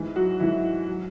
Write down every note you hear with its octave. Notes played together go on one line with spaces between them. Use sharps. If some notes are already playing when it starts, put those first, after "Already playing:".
Already playing: G#2 E3
F#3 F#4
G#2 E3 E4
F#3